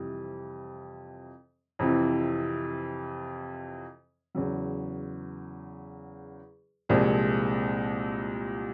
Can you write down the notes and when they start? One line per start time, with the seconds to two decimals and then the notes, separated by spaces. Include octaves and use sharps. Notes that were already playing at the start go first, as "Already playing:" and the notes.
Already playing: F2 C3 E3 G3
1.79 F2 C3 E3
4.35 E2 C#3 F#3
6.89 C2 A#2 F3 G#3 C4